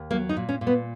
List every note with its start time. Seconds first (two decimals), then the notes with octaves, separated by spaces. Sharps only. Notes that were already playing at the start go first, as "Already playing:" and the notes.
Already playing: D#2
0.11 F#3 A#3
0.29 D#4
0.37 A#2
0.49 C#4
0.61 A#2
0.67 B3